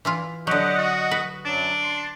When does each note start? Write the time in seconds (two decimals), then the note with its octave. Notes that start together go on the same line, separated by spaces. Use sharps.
0.05 E3 E4 F4
0.47 D3 F#3 G4 D#5 F#5
0.77 F#4
1.11 B4
1.45 F#2 F#3 D4
1.82 C6